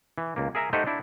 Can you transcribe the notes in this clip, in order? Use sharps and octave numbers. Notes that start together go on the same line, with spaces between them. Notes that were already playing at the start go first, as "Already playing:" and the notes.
E3
C#2 A#3
G#4 A#4 E5 G#5 A#5
A3 D#4 G4 C5 D#5 F#5
D4 E4